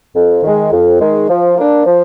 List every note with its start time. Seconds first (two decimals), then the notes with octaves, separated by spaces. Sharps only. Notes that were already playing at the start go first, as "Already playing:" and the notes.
0.15 F2
0.43 D#3 G#3
0.72 F2
1.01 D#3 G#3
1.29 F3
1.56 A#3 D4
1.85 F3